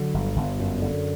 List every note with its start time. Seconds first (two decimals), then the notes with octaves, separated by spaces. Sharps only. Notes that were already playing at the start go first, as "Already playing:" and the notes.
Already playing: D3 F#3
0.14 G1
0.36 G1
0.60 F#2
0.82 D3